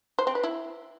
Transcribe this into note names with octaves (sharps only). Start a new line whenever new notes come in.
C5
C4
B4
E4